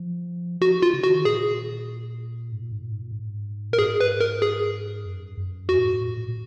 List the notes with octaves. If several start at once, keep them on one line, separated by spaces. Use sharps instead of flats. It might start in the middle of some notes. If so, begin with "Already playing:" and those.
Already playing: F3
F3 F#4
F4
C#3
C#3 F#4
D#3
A#2 G#4
G#2
A#2
G#2
A#2
G#2
A#2
G#2
A#2 A#4
G#2 G#4
B4
A#4
G#4
F#2
F#2
F2 F#4
A#2
G#2
A#2
A#2
A#2